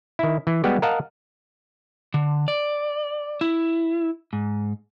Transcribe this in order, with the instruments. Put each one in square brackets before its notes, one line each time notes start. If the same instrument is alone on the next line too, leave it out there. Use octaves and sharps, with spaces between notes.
[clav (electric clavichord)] D#3 E4
E3
G3 G#3 B3 F#4 G4
A#4 D#5 F5 F#5 A5
[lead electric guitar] D3
D5
E4
G#2